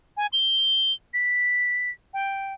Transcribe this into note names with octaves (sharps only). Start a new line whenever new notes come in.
G#5
G7
B6
G5